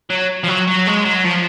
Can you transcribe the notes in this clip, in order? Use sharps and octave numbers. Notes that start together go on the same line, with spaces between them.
F#3
F3
F#3
F#3
G#3
F#3
F3